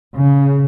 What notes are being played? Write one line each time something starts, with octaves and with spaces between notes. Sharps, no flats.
C#3